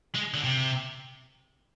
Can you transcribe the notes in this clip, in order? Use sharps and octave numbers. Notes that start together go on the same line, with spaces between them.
G#3
D3
C3